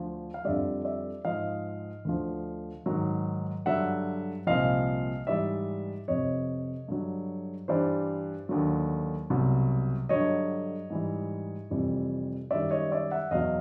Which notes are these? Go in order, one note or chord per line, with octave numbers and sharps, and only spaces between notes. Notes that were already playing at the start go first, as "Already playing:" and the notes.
Already playing: D2 D3 F3
F5
F2 D3 G3 D5 E5
D5 E5
G#2 F3 D#5 F5
D2 D3 F3
G#2 D#3 F#3
G2 D3 F#3 E5 F#5
C2 A#2 F3 D#5 F5
G#2 E3 G3 D5 E5
F2 C3 F3 C#5 D#5
G2 D3 F#3
G2 E3 G3 C5 D5
D#2 D3 F#3
C2 B2 F#3
G2 D3 F#3 C#5 D#5
G#2 E3 G3
F2 C3 E3 G3
F#2 D#3 G3 D5 E5
C#5 D#5
D5 E5
E5 F#5
E2 B2 F#3 D#5 F5